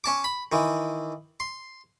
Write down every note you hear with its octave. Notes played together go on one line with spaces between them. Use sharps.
C#4 A5 D6
B5
D#3 E3
C6